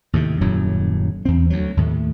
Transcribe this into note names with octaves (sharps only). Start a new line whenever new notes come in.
D#2 A2 C3
D#1 F#2 A2 F#3
E2 C4
D2 F#3
D#2 A2 A3